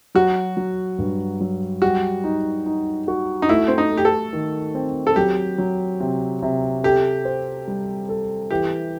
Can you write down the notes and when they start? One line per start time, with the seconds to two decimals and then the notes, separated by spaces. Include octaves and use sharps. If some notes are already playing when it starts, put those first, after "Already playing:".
0.15 F#3 F#4
0.57 F#3
0.99 G2
1.41 F#3
1.82 G3 F#4
2.24 D#4
2.66 D#4
3.08 F#4
3.42 D#4
3.49 A3 E4
3.68 C4
3.78 D#4
3.91 A3
3.97 G4
4.05 A4
4.33 D#3
4.75 C4
5.07 A4
5.16 F#3 G4
5.58 F#3
6.00 C3
6.42 C3
6.84 G4 A4
7.25 C5
7.67 G3
8.09 A4
8.51 E3 G4